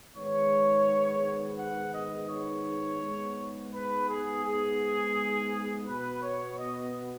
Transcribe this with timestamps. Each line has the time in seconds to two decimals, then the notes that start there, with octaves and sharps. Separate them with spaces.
0.16 G#2 D#3 G#3 B3 C#5
1.59 F#5
1.94 D#5
2.30 C#5
3.02 G#2 G#3 B3
3.73 B4
4.09 G#4
4.44 G#4
5.86 B2 B3 B4
6.22 C#5
6.58 D#5